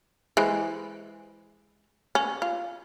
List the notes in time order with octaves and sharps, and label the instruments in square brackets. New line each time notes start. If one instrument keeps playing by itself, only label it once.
[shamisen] E3 G#3 C5
C#4
F4